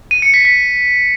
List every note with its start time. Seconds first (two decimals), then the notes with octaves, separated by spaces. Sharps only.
0.11 D#7
0.22 C#7
0.34 B6
0.45 B6